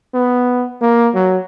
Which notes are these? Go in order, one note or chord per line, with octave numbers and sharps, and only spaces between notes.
B3
A#3
F#3